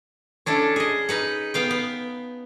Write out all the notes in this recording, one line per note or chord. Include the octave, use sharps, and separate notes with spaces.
C#4 D4 E4 A4
G#4 D#5
D#4 B4 F#5
B3 F5 G5
B3